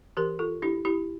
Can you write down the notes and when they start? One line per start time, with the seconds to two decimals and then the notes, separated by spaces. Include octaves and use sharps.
0.17 E3 G4 A#4
0.39 F4 A4
0.62 D4 E4 G4
0.85 E4 G4